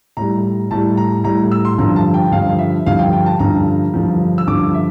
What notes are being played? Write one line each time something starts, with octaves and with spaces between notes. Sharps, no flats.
A2 G3 A#5
A2 G3 A5
A#5
A2 G3 A#5
E6
C6
G2 D3 F3 A#5
A5
G5
G2 D3 F3 F5
E5
G2 D3 F3 F5
G5
G5
A5
G2 D3 F3 A#5
G2 D3 F3
E6
G2 D3 F3 D6
E5